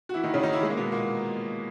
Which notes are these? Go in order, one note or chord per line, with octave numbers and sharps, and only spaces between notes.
F#4
E3 E4
D#3 D#4
C#3 C#4
D#3 D#4
E3 E4
G#3 G#4
A#3
B2 B3
A#2 A#3